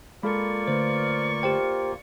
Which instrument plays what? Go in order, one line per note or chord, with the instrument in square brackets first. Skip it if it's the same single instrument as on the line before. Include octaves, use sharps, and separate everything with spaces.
[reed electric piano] G#3 A4 [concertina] A#3 F4 [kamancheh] D5 C#6 [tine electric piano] B5
[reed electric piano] D3 A3 B4 [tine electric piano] C5
[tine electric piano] G4 C5 G5